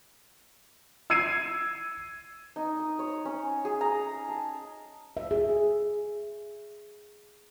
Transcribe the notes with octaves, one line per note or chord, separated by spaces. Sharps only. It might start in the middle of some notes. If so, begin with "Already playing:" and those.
E6 G#6 C7 C#7 D#7
D#4
D#6
C#5
C#4
G#4
A#5
A5
E5
G#4